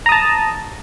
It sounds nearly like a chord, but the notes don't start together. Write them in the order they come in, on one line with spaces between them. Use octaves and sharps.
A#5 D#6 A5